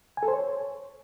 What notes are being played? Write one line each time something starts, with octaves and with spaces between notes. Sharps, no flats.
G#5
A4
C5
C#5